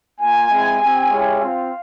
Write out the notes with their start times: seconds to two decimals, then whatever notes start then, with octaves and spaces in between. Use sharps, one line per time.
0.21 A#3 F4 G#5
0.50 G#3 C4 E4
0.79 C4 G4
1.10 G#3 C#4 E4 G4
1.39 C4 F4 F5